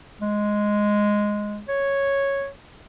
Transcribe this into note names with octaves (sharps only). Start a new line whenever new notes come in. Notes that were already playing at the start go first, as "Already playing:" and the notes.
G#3
C#5